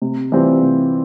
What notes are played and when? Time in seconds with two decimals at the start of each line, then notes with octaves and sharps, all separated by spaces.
0.02 C3
0.32 E3 G3 C4 F4
0.63 C3